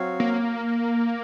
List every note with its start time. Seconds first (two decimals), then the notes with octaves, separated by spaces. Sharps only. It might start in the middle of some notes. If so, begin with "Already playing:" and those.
Already playing: F#3 C4 F#4 C#5 F5
0.20 A#3